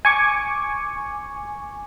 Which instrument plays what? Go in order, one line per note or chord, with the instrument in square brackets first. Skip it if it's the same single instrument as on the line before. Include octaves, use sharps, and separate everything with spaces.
[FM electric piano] G#5 C#6 D6